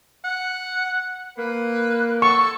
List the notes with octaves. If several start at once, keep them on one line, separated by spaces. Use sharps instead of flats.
F#5
A#3 B4
A4 C#6